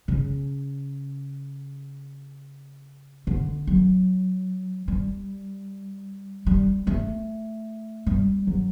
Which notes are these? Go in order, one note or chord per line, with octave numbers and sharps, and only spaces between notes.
C#3
D3
F#3
G3
G3
A3
G3
F#3